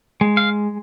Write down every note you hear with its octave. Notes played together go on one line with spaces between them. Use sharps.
G#3
F5